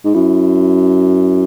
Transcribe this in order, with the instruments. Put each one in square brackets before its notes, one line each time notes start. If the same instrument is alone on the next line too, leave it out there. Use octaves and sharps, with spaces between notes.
[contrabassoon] G#2
[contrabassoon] F#2 [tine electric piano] E4